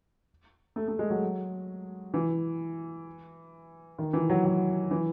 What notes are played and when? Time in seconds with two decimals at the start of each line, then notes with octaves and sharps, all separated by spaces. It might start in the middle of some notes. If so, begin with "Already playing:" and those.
0.76 A3
0.88 A3
0.99 G#3
1.10 F#3
2.14 E3
3.99 D#3
4.13 E3
4.29 F#3
4.45 F#3
4.91 E3